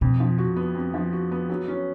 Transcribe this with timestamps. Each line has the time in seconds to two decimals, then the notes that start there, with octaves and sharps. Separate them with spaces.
0.01 F2 B2
0.20 F3
0.38 F#4
0.56 B3
0.75 F2
0.94 F3
1.13 F#4
1.31 B3
1.50 F#3
1.68 C#4